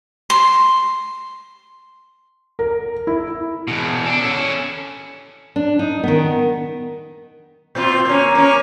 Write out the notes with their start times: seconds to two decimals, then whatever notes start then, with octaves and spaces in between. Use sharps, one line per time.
0.30 C6
2.59 A#4
3.07 E4
3.68 E2 B2
4.06 D4 A4
4.21 C#4 A4
5.56 D4
5.79 D#4
6.03 D#3 B3
7.75 A#2 C4 F4
8.05 A#3 C#4
8.35 A#3 C#4